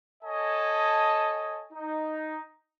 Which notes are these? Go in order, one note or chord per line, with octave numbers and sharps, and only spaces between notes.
A4 C#5 D#5 G#5 A5
D#4